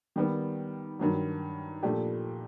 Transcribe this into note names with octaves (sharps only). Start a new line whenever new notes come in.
D#3 G3 B3
G2 D#3 F#3
A#2 F3 A3 D4 G4